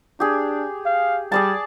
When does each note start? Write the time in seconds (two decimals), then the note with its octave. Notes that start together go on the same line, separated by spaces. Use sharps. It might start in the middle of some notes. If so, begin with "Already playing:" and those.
0.20 D4 G4 G#4
0.85 F5
1.32 G3 G#4 D5 A5